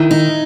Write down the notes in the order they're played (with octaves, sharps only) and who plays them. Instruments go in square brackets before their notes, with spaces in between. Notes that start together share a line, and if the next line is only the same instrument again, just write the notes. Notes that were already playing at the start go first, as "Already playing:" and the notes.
Already playing: [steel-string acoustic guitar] D#3 [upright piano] E4
[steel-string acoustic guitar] D#4